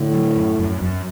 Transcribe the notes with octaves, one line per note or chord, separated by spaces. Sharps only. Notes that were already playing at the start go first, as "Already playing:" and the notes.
Already playing: A2 D3
F#3
F#2
F#2
F#2